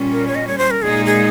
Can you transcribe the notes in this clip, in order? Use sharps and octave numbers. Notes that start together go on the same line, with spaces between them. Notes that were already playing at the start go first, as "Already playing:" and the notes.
Already playing: A#2 G3 C#4
A#4
C#5
D#5
C#5
C5
A#4
A#2 G#3 D#4 G#4
G#4